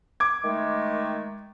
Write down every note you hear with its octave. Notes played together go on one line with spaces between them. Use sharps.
D6 G#6
D#3 G#3 A3